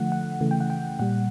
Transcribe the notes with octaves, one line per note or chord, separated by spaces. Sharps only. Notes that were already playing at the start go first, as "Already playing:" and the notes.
Already playing: D3 F3 A3 F#5
F#5
C#3 E3 A3
G5
F#5
G5
A#2 G3 F#5